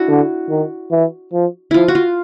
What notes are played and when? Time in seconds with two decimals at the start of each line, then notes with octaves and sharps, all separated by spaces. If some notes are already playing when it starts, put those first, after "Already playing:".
Already playing: D4 E4 F#4
0.08 D3
0.50 D#3
0.91 E3
1.33 F3
1.71 F3 E4 F4
1.88 F#4
1.95 F4